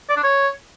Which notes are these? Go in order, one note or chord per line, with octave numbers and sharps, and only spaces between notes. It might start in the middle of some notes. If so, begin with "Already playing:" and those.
D5
D4
C#5